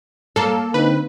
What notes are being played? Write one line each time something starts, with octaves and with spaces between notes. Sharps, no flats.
A#3 A4 F5
D3 C4 D#4 B4